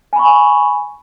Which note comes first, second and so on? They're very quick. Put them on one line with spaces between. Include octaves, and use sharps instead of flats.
G#5 B5 C#6